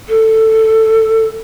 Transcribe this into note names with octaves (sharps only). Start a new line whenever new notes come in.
A4